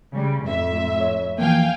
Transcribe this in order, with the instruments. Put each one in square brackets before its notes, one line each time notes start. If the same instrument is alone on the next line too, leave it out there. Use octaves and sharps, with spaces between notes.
[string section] C#3 G3
F2 A2 E5
[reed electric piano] C#5
[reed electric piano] E3 F3 A#3 [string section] F5 G5 G#5